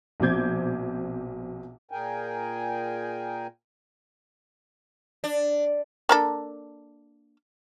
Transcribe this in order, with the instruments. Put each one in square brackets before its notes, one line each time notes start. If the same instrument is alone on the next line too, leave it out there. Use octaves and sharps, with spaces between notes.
[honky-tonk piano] A#1 B2 C4 D6 G6 G#6
[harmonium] A#2 G#4 A#4 G5 G#5
[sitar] D4
[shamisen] A#3 D4 A4